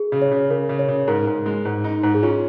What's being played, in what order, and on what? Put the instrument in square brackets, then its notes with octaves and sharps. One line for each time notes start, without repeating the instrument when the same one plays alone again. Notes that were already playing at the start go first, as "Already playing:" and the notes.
Already playing: [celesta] G#4
[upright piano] C#3
[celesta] C#5
[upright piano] C#3
[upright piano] C#3 [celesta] A#4
[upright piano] C#3
[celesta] C#5
[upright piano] C#3
[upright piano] G#2 [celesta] A#4
[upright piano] G#2
G#3
G#2
D#4
G#2
[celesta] G#4
[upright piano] C#4 [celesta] F4